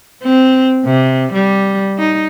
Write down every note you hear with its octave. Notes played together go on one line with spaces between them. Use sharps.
C4
C3
G3
D#4